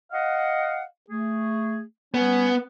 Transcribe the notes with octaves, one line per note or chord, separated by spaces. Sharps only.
D#5 F5 F#5
A3 G#4
G3 B3 C#4 G#5